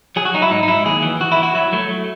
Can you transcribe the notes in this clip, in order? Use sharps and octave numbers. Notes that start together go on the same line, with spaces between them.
F#3 G#4
F#4
F#3 D#4
E4
G#2 D#4
D#4
F#3 E4
D#2 G#4
E3
E3 F#4
E4
E3
F#4
F#3 E4
F#3 A3
A3